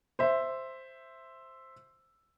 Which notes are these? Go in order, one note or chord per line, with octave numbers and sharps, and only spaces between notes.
C5 E5